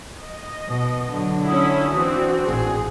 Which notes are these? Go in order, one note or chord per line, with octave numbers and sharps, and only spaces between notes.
D#5
B2
D3 F#3
C#4 E4 D#6
E3 C4 D4 F#4
A1 A#2 G#4